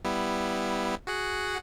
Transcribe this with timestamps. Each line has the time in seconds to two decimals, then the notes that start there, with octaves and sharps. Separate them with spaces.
0.05 G3 B3 E4
1.07 F#4 G#4 F#5